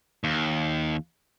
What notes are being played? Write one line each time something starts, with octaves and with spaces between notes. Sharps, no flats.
D#2